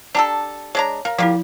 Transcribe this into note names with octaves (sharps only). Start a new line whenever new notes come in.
D4 G4 A4 A5 A#5
G#3 D4 C#5 A#5
A#4 F5
F3 A#3 E4 F4 G4